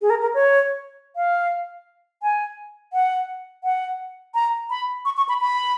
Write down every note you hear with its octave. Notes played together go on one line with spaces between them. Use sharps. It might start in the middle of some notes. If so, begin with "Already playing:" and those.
G#4
A#4
A#4
C#5
F5
G#5
F#5
F#5
A#5
B5
C#6
C#6
B5
B5